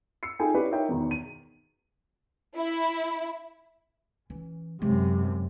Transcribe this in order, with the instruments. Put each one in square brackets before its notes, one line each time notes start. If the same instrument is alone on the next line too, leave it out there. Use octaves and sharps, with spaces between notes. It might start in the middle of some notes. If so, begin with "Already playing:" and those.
[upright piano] E6 C7 C#7
D#4 F4 G#4 A4 G5 G#5
C#4 E4 G4 B4 C#5 D5
D#4 A#4 C#5 D#5 E5 G5
E2 B2 D#3
D#7
[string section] E4
[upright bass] E3 C#4
[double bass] F#2 C3 [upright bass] G#3